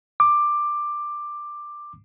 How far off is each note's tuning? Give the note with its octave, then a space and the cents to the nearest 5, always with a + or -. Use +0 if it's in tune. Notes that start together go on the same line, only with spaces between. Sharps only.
D6 +10